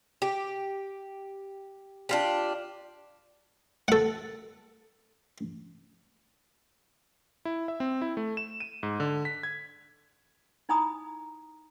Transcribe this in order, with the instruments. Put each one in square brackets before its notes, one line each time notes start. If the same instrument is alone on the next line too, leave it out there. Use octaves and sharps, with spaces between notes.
[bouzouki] G4
D4 F4 G4
[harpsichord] A4 F#5
[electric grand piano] E4
E5
C4
E4
A3
E7
D#7
G#2
D3
B6
G#6
[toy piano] D#4 E4 G#5 A#5 B5 D#6